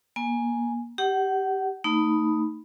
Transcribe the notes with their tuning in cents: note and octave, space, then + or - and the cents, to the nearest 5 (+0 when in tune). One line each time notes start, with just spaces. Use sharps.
A#3 +30 G#5 +0
G4 +0 F#5 +30
A3 +40 D#4 +0 B5 +0